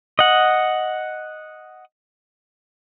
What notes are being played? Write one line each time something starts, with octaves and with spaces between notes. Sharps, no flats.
D#5 F#5